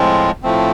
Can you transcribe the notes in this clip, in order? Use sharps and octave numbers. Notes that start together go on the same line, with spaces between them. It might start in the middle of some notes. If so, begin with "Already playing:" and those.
Already playing: A2 F3 G#3 C4 F4
A2 F3 A3 C4